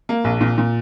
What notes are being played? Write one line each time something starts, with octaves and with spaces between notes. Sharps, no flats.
A#3
A#1
A#2
A#2